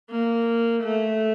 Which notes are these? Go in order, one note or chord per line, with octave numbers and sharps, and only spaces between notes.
A#3
A3